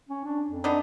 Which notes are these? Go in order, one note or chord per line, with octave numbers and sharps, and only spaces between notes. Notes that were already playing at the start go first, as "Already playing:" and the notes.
C#4
D4
F2
B3 D4 D#4